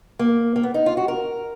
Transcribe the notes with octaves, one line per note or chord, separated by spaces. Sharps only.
A#3
A#3
B3
D#4
F4
F#4
A#4